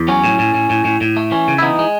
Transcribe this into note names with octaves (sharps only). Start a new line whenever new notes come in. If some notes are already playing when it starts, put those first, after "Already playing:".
Already playing: E2
F#3 C#4
A2
A2
A2
A2
A2
A2
A3
E3 C#4
C#3
E4
E3 B3 D#4
G#3